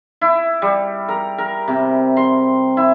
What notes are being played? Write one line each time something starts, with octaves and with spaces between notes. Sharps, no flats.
E4
G3
A#4
A#4
C3
C6
E4